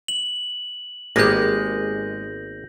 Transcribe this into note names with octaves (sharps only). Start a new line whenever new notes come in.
F#7
G#1 G#3 A#3 B3 G4 G6 A#6